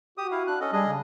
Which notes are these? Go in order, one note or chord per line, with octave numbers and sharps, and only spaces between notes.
F#4 G4 D#6
E4 F5
D4 F#6
C#4 A4 D#5
G3 D4 G#4 D#5
C#3